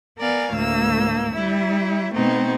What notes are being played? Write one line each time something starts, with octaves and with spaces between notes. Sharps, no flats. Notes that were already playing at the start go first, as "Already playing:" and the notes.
B3 A#4 D5 F5 G#5
D2 A2 A#3 E6
G3 E4 E5
B2 A3 B3 C4 D#4